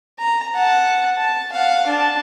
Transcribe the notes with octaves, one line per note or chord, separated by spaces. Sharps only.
A#5
F#5 A5
A5
F5 F#5
D4 A5